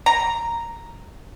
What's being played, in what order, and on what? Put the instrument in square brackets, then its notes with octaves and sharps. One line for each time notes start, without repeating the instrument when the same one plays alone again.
[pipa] A#5